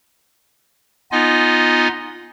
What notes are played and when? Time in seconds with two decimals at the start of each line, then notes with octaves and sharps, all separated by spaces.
1.12 B3 D#4 F4 D#5 G#5